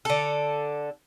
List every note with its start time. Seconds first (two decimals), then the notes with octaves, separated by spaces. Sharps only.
0.05 D3 A4